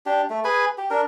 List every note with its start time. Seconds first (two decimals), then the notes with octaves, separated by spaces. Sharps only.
0.06 D4 G4
0.30 A3
0.44 G#4 B4 G#5
0.78 G4
0.91 D4 A#4